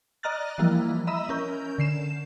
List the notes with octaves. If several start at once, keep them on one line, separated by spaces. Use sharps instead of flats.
D5 D#5 A#5 F6 F#6 A6
E3 F3 G3 A#3 E4
D#5 E5 A#5 B5 E6
C#4 A#4 G6
D3 C7 E7